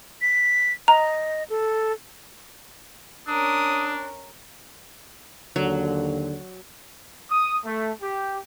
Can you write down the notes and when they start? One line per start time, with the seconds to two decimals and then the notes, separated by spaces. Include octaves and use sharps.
0.22 B6
0.88 D#5 A#5
1.50 A4
3.27 C#4 D4 A#4 D#6
5.56 D#2 D3 F#3
7.31 D#6
7.65 A3
8.02 G4